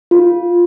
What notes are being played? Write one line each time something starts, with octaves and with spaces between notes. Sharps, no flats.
F4